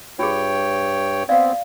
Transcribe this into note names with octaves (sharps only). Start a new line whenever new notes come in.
G2 F4 G#4 C#5 G5
B3 C4 D5 F5